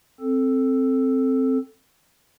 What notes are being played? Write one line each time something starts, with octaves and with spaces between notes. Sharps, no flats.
C4 A4